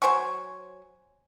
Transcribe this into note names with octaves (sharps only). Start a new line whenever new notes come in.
F#3 C5 G#5 C#6